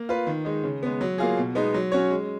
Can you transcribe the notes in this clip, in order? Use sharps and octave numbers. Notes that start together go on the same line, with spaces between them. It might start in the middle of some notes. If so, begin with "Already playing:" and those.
Already playing: A#3
F4 B4
D#3
G#3 D#4
C#3
G#3 B3
F#3
A#3 F4 G#4
B2
G#3 B3 D#4
F#3
C#4 F#4 C#5
G#3